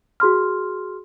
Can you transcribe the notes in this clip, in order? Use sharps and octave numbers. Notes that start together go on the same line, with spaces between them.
F#4 G#4 C6 F6